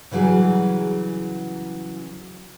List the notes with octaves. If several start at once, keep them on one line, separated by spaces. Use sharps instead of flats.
C#3 E3 F#3 G3 G#4